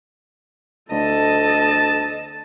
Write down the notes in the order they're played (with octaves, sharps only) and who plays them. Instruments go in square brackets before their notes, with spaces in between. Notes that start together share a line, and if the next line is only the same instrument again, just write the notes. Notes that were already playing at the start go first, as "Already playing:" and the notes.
[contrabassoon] D2 [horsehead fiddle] A4 D#5 [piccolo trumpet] A5